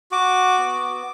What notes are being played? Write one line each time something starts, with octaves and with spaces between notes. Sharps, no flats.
F#4 D6
B3